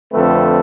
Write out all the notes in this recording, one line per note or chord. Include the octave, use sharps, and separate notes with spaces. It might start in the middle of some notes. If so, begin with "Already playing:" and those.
F2 D3 F3 A3 C4 A4 B4